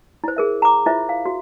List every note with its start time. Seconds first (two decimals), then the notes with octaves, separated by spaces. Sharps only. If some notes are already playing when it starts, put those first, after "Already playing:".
0.24 E4 C5
0.37 G#4 A#4 E5
0.62 A#5 D6
0.86 E4 F4 C5 E5 B5
1.09 F5
1.26 F#4